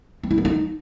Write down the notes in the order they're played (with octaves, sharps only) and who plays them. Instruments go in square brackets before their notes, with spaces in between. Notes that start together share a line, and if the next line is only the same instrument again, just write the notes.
[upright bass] C4
E4
B3
D#4